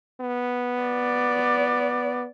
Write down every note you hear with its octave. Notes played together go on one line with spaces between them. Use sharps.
B3
D5